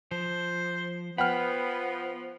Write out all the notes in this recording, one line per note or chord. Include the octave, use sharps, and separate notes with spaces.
F3 C5
F3 B3 F#5 G5 B5 F6